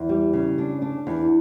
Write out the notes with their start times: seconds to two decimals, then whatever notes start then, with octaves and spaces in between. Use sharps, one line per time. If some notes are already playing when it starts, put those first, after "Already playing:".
Already playing: E2
0.09 G3
0.33 C#3
0.58 D4
0.82 D4
1.07 E2